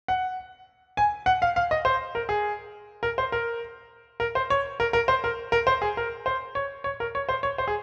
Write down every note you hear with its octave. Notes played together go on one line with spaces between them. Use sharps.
F#5
G#5
F#5
F5
F5
D#5
C5
A#4
G#4
A#4
C5
A#4
A#4
C5
C#5
A#4
A#4
C5
A#4
A#4
C5
G#4
A#4
C5
C#5
C#5
A#4
C#5
C5
C#5
C5
G#4